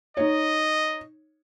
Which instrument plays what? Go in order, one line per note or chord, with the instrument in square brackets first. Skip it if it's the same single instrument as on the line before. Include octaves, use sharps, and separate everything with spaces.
[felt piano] D#4 C#5 [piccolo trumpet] D#5